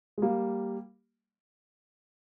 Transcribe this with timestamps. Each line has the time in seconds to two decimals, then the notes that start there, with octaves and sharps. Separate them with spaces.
0.18 G#3
0.22 G3 A#3